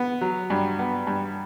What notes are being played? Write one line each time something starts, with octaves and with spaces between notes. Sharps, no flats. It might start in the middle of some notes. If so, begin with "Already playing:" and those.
Already playing: B3
F#3
G2
B3
G2